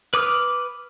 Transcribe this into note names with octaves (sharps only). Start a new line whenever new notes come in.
B4 D6 D#6 F6